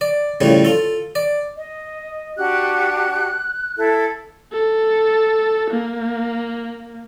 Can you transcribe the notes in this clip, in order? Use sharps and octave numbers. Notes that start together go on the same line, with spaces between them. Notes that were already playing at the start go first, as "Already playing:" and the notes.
D5
A2 C#3 F3 G3
F4 A4
D5
D#5
D4 F#4 G4 F#6
E4 A4
A4
A#3